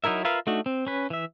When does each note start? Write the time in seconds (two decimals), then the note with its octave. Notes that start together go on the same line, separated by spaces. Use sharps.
0.04 F#3 D#4 E4 A#4 E5
0.25 F4 A#4 B4 E5 F5
0.47 A3 D4 D#4 F#4
0.66 C4
0.87 C#4 B4
1.10 E3 E5